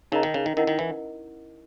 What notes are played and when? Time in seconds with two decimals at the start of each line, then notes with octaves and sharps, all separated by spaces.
0.12 C#3 D#4 A#4 D#5 A#5
0.23 D#3
0.34 C#3
0.46 D#3
0.57 D#3 C#4 E4 A#4 D#5 F#5
0.67 D#3
0.79 E3